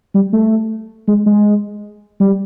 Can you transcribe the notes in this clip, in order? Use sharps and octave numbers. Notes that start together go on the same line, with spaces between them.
G3
A3
G#3
G#3
G3